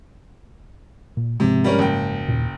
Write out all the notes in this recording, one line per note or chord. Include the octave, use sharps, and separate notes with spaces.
A#2
G#2 C3 F3 G#3
G3 C#4 A#4
F#1 G5
D#2 A#2